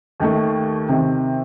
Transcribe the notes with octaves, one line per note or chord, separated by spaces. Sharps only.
D#2 D#3 A3
C3 D#3